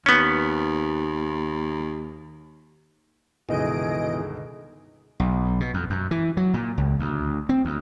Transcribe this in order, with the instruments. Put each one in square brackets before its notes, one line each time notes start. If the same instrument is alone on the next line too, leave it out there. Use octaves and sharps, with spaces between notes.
[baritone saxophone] D#2 [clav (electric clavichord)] B3 C#4
[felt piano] G1 C#2 D#3 [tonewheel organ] B2 E3 [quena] G#4 [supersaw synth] D#5 D7
[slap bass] B1
B2
F2
F#2
E3
F#3
A#2
C#2
D2
C4
D2